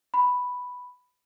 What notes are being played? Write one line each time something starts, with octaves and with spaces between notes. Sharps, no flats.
B5